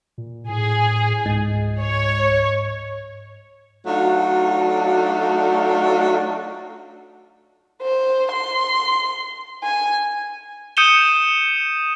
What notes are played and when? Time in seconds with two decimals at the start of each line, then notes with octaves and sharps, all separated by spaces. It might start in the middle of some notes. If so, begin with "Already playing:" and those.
0.18 A#2
0.49 A2 G#4
1.26 C#2 G#2
1.80 C#5
3.86 F#3 A3 D4 D#4 F4 F#4
7.83 C5
8.32 C6
9.64 G#5
10.77 D#6 G6 C#7 D#7 E7 G7